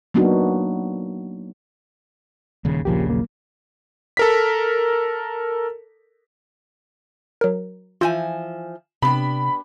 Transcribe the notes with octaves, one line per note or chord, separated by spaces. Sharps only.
F#3 A#3 B3 D4 D#4 F#4
D#1 D#2 C#3
D#1 A#1 C#3 F3 A#3 G4
F#3 A#3
A4 A#4 B6
F#3 A#4
E3 F3 F4 G#5 G6
C3 B3 D4 G4 B5